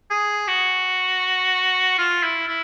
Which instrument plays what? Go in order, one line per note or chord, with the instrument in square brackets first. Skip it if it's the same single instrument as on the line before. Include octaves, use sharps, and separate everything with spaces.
[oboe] G#4
F#4
F4
E4
E4